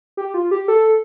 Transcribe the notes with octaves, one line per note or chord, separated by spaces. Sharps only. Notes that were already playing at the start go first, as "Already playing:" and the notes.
G4
F4
G4
A4